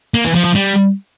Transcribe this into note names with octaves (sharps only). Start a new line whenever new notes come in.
A#3
E3
F3
F3
G3